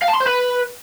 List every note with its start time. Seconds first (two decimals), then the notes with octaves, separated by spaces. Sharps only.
0.02 F5
0.08 A5
0.14 C6
0.20 C5
0.26 B4